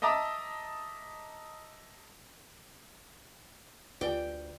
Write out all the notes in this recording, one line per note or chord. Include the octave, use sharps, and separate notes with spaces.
D#5 E5 A5 A#5 D6 D#6
D2 F4 G4 B4 D5 G5 G#5